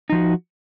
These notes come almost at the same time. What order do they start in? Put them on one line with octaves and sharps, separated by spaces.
D#4 F3 F#4